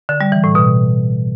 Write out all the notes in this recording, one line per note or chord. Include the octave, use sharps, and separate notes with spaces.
D3
G3
E3
A2
B2